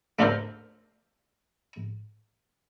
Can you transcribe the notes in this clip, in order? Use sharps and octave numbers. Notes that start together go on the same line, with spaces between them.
A3 D4 F4 A4 A#4 C5